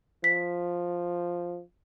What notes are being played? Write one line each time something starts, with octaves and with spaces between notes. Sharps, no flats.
F3 B6